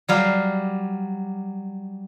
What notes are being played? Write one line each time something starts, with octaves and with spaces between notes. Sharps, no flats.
F#3 G3 F5